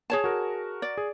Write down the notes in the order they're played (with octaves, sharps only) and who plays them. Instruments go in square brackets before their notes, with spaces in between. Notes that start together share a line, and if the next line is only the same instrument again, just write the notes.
[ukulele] G#4 C#5 A5
[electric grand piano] F#4 A#4
[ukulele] D5
[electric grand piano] G#4